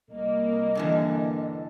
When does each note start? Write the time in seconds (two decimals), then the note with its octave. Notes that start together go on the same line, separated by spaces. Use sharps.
0.10 C2 A#3 D#5
0.75 G2 D3 E3